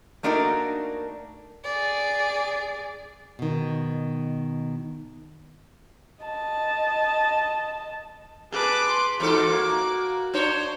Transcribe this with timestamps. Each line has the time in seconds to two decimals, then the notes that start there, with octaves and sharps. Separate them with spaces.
0.23 A3 A#3 D4 D#4 F#4 A#4
1.64 G#4 D5
3.39 B2 D#3
6.24 D#5 A5
8.52 G#4 B4 A5 D6
8.87 C6
9.20 E2 G#2 F#4 A4 D6
9.49 A#3
10.34 D4 C5 C#5